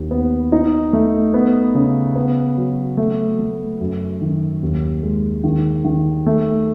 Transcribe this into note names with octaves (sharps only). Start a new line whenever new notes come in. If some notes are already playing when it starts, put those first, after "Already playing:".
Already playing: D#2
B3
D#4
A3
B3
C#3
B3
F#3
A3
A3
F#2
D#3
D#2
G#3
D#3
D#3
A3